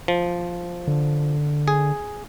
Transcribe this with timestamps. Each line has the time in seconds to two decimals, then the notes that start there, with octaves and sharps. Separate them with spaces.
0.08 F3
0.87 D3
1.68 G#4